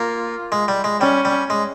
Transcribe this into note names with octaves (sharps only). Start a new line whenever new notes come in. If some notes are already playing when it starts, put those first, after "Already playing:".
Already playing: A#3 F4
G#3
G3
G#3
G3 C#4
G3
G#3